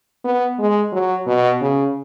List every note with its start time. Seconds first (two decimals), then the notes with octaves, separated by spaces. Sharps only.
0.24 B3
0.59 G#3
0.92 F#3
1.27 B2
1.61 C#3